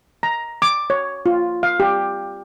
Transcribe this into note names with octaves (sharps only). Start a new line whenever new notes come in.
A#5
D6
C#5
F4
F5
G4